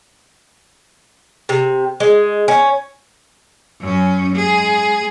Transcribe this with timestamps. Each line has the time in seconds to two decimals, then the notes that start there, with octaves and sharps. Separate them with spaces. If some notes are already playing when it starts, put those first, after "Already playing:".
1.49 C3
2.00 G#3
2.48 C#4
3.81 F#2 C#4
4.36 G#3 G#4